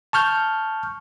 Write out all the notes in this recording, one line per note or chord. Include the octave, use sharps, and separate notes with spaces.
A5 C#6 F6 G6